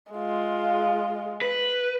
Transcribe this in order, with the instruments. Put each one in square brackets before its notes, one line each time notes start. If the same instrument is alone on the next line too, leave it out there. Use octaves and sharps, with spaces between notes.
[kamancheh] G#3 F4
[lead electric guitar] B4